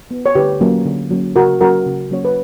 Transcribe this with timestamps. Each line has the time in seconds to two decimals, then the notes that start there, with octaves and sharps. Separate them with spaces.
0.11 B3
0.26 C#5
0.35 D3 G4 B4
0.61 F#3 A#3 C#4
0.86 D3
1.11 F#3 A#3 C#4
1.36 C#3 F#4 A#4
1.61 F#3 A#3 C#4 F#4 A#4
1.86 C#3
2.11 F#3 A#3 C#4 C#5
2.25 B4